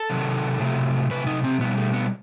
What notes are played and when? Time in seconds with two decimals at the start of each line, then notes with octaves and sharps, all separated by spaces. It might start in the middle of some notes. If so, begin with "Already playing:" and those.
Already playing: A4
0.10 C3 D#3 F#3
0.60 C3 F#3 A3
1.10 C3 F#3 A3 B4
1.27 D#4
1.44 C4
1.60 B2 G3 B3
1.77 A3
1.94 B3